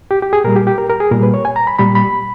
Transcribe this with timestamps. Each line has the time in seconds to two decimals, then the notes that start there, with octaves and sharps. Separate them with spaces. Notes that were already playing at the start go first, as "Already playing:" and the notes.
0.11 G4
0.22 G4
0.33 G#4
0.44 A#2 G3 A#4
0.56 G4
0.67 G4
0.78 A#4
0.89 A#4
1.00 G#4
1.11 A#2 G3 A#4
1.23 B4
1.34 C#5
1.45 G#5
1.56 A#5
1.67 B5
1.79 A#2 G3 B5
1.95 B5